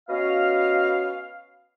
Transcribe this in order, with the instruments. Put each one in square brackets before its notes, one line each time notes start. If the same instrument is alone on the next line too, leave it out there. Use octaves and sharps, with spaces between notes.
[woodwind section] B3 C#4 F#4 D#5 F5